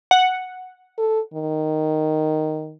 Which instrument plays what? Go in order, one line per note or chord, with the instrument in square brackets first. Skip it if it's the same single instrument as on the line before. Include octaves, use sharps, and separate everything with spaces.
[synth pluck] F#5
[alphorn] A4
D#3